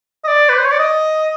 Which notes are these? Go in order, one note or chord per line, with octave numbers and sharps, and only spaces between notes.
D#5
D5
B4
C5
C#5
D5
D#5